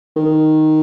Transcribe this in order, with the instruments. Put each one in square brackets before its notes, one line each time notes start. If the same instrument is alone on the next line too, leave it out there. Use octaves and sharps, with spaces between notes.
[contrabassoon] D#3